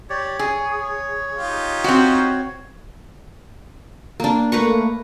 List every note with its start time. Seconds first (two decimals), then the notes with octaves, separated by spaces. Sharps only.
0.10 G4 C#5 D5
0.39 G#4 C#5
1.35 D#4 F4 G4
1.84 C4 F#4
4.20 A#3 D4
4.52 A3 A#3 B4 A#5 C#6